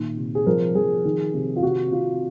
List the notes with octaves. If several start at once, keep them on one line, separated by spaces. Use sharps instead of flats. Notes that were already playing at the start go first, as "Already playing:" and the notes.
Already playing: A#2 D#3
C3
G#4
F3 A#4
F3 G#4
D#3
C3
F4
C3 F#4
C3 F4